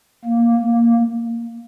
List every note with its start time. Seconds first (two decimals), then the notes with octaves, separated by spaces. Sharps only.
0.25 A#3
0.58 A#3